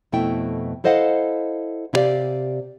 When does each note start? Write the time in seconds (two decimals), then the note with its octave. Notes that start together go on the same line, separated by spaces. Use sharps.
0.12 F2 B2 A3 E4 G5
0.84 E4 A4 C5 D#5 F5 F#5
1.93 C3 E4 G4 B4 D5 F5